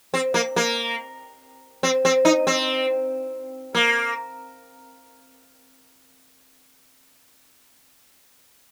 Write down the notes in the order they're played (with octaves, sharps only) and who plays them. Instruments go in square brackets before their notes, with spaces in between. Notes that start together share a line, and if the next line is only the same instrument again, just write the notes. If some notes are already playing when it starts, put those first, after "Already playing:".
[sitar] C4
A#3
A#3
C4
C4
D#4
C4
A#3